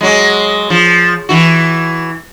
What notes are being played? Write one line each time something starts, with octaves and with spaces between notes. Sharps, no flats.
F#3 G#3
F3
E3 F#4